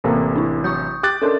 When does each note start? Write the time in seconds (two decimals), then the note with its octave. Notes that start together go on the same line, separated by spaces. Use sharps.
0.04 A1 C3 A#3 A4 B4
0.36 D4 E4
0.64 F#3 C#6 D#6 G6
1.03 G4 D6 F#6 A6
1.22 C#4 D4 A4 A#4 C6